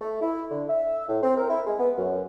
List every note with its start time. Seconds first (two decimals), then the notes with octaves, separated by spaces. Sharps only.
0.01 A3
0.22 E4
0.51 D3
0.70 E5
1.09 A2
1.23 C4
1.37 A#4
1.50 E4
1.67 G#3
1.79 B3
1.98 F#2